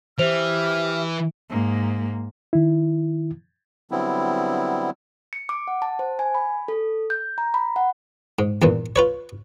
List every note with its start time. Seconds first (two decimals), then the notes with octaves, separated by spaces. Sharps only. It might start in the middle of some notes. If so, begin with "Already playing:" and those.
0.19 E3 G4 C5 E5 F6 F7
1.50 G#2 A#3
2.53 D#3 E4
3.91 D3 F#3 G3 B3 C4 E4
5.33 C#7
5.49 D6
5.68 F#5
5.82 A5
5.99 C5
6.19 G#5
6.34 B5
6.68 A4
7.10 G6
7.38 A#5
7.54 B5
7.76 F#5
8.39 G#2
8.62 E2 G2 A#2
8.96 F4 B4 C#5